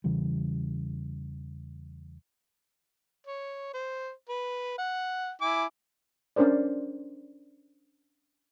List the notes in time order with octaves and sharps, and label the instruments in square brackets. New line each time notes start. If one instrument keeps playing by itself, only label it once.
[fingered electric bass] E2 C#3 E3 G3
[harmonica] C#5
C5
B4
F#5
E4 G#5 D6
[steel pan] C#4 D4 A#4 C5 D5